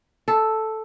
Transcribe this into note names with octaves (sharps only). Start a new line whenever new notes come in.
A4